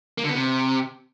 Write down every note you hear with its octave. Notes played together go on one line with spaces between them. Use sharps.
A#3
D3
B3
C3